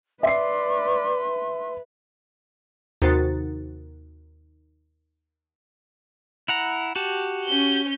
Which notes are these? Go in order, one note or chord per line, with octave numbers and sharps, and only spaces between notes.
B4 D5 E5 C6 C7
D#2 C3 F#4 C5 A6
E4 F#5 A#5
F#4 G4 A5
C#4 G6